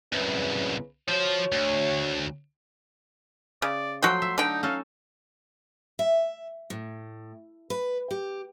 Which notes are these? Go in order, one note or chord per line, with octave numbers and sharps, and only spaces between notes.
C2 F#2 C#3 B4
F3 F#4 C5 C#5
D2
C#3 D5
F3 F#3 A3 F#4 G5 C6
E5
D3 D#4 G5
C#4 D#4 A4 F5
E5
A2
B4
G4